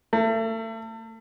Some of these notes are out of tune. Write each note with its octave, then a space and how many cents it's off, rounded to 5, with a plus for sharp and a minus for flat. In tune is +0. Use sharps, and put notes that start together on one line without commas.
A3 +35